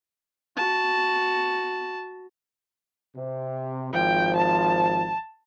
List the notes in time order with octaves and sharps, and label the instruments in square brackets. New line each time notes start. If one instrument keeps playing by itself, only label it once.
[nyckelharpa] F#4 A5
[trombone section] C3
[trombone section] G#1 F3 [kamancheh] G5
[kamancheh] A5